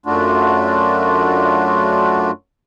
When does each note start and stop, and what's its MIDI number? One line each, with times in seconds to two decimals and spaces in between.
0.06 2.31 42
0.06 2.31 57
0.06 2.31 62
0.06 2.31 65
0.06 2.31 66